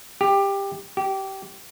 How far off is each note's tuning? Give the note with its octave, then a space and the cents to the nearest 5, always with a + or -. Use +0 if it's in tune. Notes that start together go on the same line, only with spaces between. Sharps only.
G4 +15
G4 -20